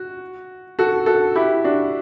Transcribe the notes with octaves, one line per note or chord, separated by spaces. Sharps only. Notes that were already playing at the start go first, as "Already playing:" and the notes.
Already playing: F#4
F#4 A4
F#4 A4
E4 G4
D4 F#4